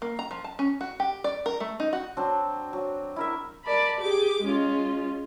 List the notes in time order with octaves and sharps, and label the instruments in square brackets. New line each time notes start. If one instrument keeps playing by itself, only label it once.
[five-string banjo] A#3
A#5
F3
A5
C#4
F#4
G4
D5
A#4
A3
D#4
F#4
[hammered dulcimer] F#3 C4 D4
F#3
E4 A#4 E5
[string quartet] A#4 D5 A5 B5
G4 G#4 D6
G#3 C#4 F4